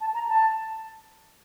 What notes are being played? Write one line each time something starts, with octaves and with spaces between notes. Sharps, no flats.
A5
A#5
A5